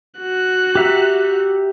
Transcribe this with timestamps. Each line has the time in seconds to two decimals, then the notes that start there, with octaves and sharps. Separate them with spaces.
0.19 F#4 F#6
0.75 G4 E5 A#5